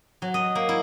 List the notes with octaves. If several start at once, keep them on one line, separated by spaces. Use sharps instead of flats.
F#3
D#5
A#3
E4